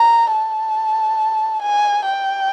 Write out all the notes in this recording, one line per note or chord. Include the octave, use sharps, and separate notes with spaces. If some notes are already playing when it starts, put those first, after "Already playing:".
Already playing: A#5
A5
G#5
G5